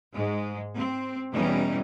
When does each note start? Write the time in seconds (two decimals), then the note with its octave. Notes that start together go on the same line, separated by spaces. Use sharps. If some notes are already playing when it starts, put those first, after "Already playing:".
0.14 G#2 G#3
0.76 C4
1.32 E2 B2 E3 G3 C#4 D#4